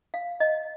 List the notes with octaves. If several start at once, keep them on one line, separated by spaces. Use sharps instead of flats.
F5
D#5